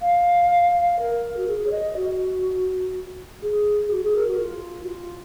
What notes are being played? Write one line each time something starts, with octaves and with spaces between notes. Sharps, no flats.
F5
A#4
F#4
G#4
C#5
D#5
F#4
G#4
F#4
G#4
A#4
F#4
F4
F#4
F4